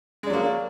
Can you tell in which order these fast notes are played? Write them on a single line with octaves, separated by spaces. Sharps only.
G#3 D4 F#3 A#3